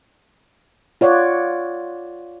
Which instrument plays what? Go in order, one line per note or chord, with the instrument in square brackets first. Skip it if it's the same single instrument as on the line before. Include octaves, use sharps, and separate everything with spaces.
[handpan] F4 C#5 D5 F#5